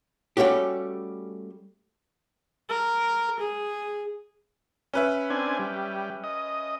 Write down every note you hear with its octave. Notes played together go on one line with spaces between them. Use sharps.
G3 A3 C#4 F#4 G4
A#4
G#4
C#4 B4 E5
C4 D4 G#5
G3
D#5